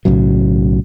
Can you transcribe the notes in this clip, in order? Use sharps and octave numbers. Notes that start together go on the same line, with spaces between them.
B1 A2 C#3 F#3